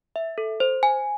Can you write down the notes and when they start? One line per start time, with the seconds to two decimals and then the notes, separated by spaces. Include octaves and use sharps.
0.16 E5
0.38 A4
0.60 C5
0.83 G#5